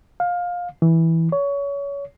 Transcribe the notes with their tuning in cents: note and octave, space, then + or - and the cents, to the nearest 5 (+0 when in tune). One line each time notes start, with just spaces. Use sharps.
F5 +20
E3 -10
C#5 +25